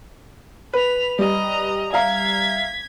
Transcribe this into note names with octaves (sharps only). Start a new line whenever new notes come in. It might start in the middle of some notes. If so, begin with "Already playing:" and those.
B4 B5 F7
G3 D#5 A#5
E5 F5 A#5 G#6 B6